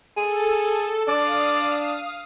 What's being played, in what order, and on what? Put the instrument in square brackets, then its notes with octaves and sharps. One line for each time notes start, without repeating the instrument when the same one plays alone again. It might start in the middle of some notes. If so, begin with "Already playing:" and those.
[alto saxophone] G#4 [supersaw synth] A4
[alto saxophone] D4 [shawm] D5 [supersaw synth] F5 D#6